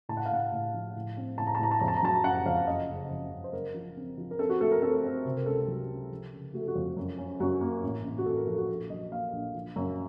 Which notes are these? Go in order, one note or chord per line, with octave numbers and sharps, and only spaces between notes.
A2 A5
F#5
F5
A2 F#5
A2
F3
A2
C4
A2 A5
A#5
A5
A2 A#5
A5
F2 A#5
A5
A#5
F#3 A5
F#1 F#5
F2 F5
F#1 D#5
C#3
F2
F#1
C5
F#2 A#4
F3
C4
F3
A#4
C4 A4
F#4
A3 A4
A#4
C4 A4
C4
C3
A#4
C#2 A4
F#3
C#2
F3
C#3
A3 F#4
A4
F#4
F2
F#2
C#4
F#2 F#4
A#3
A1
A1
F#4
A1 A4
A#4
F3 A4
F#4
A#1 A4
F#3 D#5
A#3 F5
A#1
F3
F#2